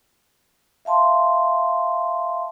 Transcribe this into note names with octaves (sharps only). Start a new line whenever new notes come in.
E5 F5 A5 C6